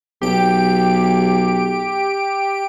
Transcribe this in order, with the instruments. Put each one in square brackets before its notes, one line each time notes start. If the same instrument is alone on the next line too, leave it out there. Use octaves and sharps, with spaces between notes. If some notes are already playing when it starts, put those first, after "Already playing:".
[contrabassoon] B1 [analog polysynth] G4 D7